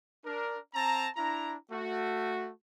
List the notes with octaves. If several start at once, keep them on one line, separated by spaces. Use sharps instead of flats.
D4 A#4
C4 A5 A#5
D4 E4 A#5
A3 F#4